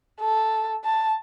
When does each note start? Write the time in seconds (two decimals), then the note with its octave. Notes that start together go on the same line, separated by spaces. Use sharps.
0.21 A4
0.84 A5